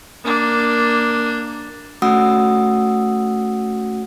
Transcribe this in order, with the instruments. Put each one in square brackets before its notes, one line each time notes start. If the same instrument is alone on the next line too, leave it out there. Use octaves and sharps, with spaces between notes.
[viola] A#3 D4
[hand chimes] A3 C#4 F#4 F#5 D#6 E6